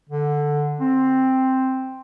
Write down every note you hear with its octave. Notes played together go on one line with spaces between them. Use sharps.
D3
C4